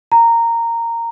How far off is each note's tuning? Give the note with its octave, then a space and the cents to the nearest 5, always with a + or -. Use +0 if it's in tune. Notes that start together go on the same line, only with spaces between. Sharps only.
A#5 -10